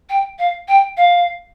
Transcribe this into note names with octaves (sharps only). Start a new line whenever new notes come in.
G5
F5
G5
F5